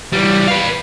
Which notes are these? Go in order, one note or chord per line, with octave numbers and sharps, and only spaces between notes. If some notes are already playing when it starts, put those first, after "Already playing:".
E3 G3
B4 F5